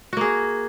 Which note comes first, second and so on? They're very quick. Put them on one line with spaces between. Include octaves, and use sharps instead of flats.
F#4 A#3 G#4